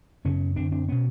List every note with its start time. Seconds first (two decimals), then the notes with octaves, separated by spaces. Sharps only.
0.25 F#2 C#3 B3 C#4
0.56 F#2 D3 C4 D4
0.72 C4 D4
0.88 B2 B3 C#4